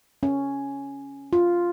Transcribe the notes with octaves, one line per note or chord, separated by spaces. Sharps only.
C#4
F4